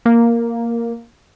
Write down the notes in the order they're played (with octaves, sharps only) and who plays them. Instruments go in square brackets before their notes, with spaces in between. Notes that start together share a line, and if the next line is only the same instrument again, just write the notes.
[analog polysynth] A#3